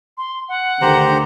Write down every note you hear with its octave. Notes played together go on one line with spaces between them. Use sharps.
C6
F#5
D2 D3 D#3 G4 C5 A#5